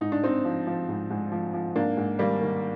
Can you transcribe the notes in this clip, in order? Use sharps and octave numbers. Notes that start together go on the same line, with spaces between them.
G#2 D#4
D4
G#2 C4 D#4
F3
F3
G#2
G#2
F3
F3
G#2 A#3 D4
G#2
D#3 G3 A#3
D#3